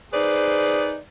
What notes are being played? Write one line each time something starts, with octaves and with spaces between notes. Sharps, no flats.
D#4 G#4 B4 C5 D5